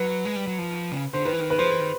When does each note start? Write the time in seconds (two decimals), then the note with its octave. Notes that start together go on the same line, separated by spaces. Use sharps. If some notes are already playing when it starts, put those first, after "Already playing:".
Already playing: F#3 B4
0.25 G#3
0.36 G3
0.47 F#3
0.58 F3
0.92 C#3
1.13 D3 C5
1.25 D#3 B4
1.33 E3
1.41 D#3
1.50 B4
1.59 F3 C5
1.70 E3
1.80 D#3